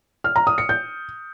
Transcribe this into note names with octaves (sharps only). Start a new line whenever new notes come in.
F6
A#5
D#6
C#7
G6